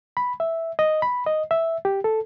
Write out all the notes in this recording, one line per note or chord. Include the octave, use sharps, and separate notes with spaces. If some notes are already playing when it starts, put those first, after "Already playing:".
B5
E5
D#5
B5
D#5
E5
G4
A4